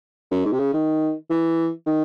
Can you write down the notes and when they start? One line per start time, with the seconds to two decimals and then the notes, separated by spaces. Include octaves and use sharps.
0.31 F#2
0.45 G#2
0.52 C3
0.59 C#3
0.73 D#3
1.30 E3
1.86 D#3